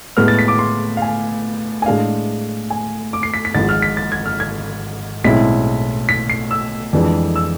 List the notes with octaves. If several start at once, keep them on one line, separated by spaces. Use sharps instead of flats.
A2 G#3 B3 F6
A6
B6
D6
C6
F5
G#5
G#5
A2 G#3 D4 F5
G#5
D6
C7
B6
B6
G#1 G#2 F3 G#3 A6
F6
B6
A6
G#6
F6
G#6
B1 A2 G#3 C4 E4 B6
B6
C7
E6
F2 E3 G#3 D4
E6